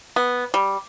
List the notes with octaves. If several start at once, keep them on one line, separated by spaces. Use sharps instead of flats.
B3
G3